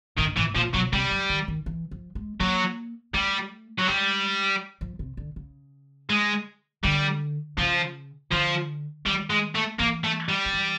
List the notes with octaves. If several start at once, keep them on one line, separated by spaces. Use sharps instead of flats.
A2 D#3
A2 E3
A#2 F3
B2 F#3
C3 G3
F#3
D#3
D#3
E3
F3
G#3
F#3 A#3
G3 A3
F#3
G3 G#3
F3
C3
D3
C#3
G#3
D3 G3
C#3 F3
D3 F3
D#3 G3
G#3
A3
E3 A#3
A3
G3
D#3
E3